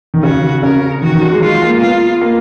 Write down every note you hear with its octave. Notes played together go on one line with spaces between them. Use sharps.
D#3
C#3 F#4
C#3 A#4
D#3 F#4
D#3
F#3
G#3
G#3 F4
A#3
B3 F4
A#3